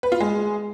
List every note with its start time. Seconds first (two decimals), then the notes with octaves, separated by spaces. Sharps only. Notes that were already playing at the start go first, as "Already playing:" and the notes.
0.03 B4
0.12 F4
0.20 G#3